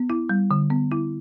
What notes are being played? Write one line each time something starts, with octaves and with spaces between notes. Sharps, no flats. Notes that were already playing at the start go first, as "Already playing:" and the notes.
Already playing: B3
E4
G3
D3
B3
E4